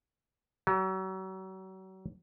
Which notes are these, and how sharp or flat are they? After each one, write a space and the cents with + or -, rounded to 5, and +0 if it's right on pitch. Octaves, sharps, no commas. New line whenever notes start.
F#3 +35